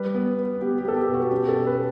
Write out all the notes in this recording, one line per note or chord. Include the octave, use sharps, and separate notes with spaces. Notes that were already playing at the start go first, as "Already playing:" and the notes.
Already playing: G3 B4
B3
B3
B3 G4
G4
B3 A4
G4
B2
F#4
C#4 G4
A4
B2
B4